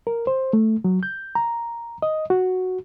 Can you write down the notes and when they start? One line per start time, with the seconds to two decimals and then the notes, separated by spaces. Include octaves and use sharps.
0.07 A#4
0.27 C5
0.53 A3
0.84 F#3
1.03 G6
1.35 A#5
2.02 D#5
2.30 F#4